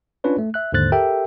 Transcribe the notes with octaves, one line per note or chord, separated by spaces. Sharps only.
C#4 D4 F4 B4 C#5
A3
E5 F#6
D#2 G#2 D3 C5 F#6 A6
G4 A4 A#4 E5 G5